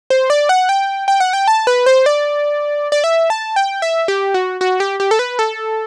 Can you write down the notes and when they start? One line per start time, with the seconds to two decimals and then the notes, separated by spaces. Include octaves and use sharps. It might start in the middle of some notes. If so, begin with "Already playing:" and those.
0.10 C5
0.30 D5
0.49 F#5
0.69 G5
1.08 G5
1.20 F#5
1.33 G5
1.48 A5
1.67 B4
1.86 C5
2.06 D5
2.92 D5
3.04 E5
3.30 A5
3.56 G5
3.82 E5
4.08 G4
4.34 F#4
4.61 F#4
4.80 G4
5.00 G4
5.11 A4
5.19 B4
5.39 A4